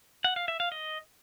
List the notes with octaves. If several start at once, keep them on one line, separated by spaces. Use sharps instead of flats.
F#5
F5
E5
F5
D#5